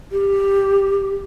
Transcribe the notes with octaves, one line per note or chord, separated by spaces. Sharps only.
G4